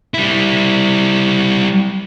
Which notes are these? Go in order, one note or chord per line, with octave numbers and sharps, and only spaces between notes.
G3 E4